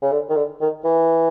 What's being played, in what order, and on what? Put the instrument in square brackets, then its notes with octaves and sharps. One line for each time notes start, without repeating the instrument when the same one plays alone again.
[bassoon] C#3
D3
D#3
D3
D#3
E3